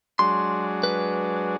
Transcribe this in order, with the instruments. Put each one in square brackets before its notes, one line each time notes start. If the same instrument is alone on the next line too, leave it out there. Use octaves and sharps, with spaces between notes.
[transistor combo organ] F#3 G#3 D4 [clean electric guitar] C6
[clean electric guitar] B4